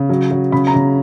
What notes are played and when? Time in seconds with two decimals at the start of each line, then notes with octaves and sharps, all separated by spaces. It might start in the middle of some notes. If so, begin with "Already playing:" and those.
Already playing: C#3
0.09 F#3
0.31 F#3
0.52 C#3 B5
0.67 A#5
0.74 C#3